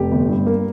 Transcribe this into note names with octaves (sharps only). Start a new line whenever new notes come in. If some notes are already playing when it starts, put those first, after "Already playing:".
Already playing: F1 G4
G1
G2
A#3